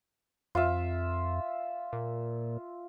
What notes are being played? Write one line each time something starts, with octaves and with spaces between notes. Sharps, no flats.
F2 F4 E5
A#2